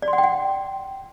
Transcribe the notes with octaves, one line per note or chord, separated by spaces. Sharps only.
D5
C6
F#5
G5
F#5